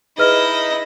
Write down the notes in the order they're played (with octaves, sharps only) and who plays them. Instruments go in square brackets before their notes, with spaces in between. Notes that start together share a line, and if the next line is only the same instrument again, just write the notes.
[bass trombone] D#4 [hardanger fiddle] E4 D#5 [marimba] G#4 B4 F6